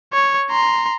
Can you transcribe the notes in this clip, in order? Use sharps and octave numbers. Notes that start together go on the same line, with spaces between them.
C#5
A#5 C6